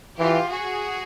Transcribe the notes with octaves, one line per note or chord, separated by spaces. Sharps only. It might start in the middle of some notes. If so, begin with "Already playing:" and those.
E3 F4 G4
F#4 G#4